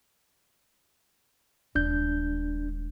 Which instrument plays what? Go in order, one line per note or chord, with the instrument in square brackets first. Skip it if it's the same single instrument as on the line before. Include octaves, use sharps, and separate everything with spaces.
[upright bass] D#1 G#3 [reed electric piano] D4 G6